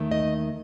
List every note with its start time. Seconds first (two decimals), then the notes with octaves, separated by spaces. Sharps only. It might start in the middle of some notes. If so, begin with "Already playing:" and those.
Already playing: D#2 D#3 A3
0.11 D#5